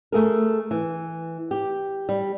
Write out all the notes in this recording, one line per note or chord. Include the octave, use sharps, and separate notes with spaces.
A3 G#4 A#4
E3
G4
G3